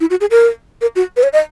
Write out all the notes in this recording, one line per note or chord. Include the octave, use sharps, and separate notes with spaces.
E4
F#4
G#4
A#4
A#4
F#4
B4
C#5
D#5